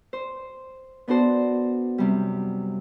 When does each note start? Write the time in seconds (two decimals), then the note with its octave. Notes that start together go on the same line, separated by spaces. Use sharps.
0.13 C5
1.08 B3 D4 F#4 A4 C5
1.98 F#2 C3 G3